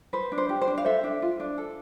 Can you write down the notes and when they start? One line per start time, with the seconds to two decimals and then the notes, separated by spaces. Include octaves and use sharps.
0.13 B4 C5
0.32 D4
0.38 C5
0.49 G4
0.62 C5
0.68 D4
0.78 F5
0.85 A4 C5 E5
1.04 D4
1.22 F4
1.40 D4
1.58 A4